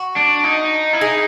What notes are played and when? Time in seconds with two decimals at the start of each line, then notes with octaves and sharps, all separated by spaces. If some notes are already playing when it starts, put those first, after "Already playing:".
Already playing: F#4
0.16 D4
0.44 D#4
0.93 E4
1.01 D#4 G#4